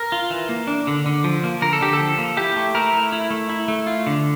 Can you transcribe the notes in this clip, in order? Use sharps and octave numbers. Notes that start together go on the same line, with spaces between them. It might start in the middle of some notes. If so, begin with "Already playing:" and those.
Already playing: A#4
F4
E3
A#3
D4
D3
D3
F3
A#3
D3 A#4
A4
D3 G4
A4
F3
A#3
E4 G4
A3
E4 A#4
A3
E4
A3
E4
A3
F4
D3